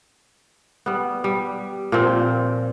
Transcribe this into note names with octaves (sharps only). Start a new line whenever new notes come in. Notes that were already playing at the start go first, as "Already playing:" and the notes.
G3 B3
G3
A#2 F3 C4